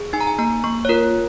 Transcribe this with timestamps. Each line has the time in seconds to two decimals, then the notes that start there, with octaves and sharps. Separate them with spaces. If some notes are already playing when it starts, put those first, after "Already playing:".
Already playing: G#4
0.13 D#4 G#5
0.21 A#5
0.27 G#5
0.39 A#3 A#5
0.64 A#3 C#6
0.85 C#5
0.89 F4 A#4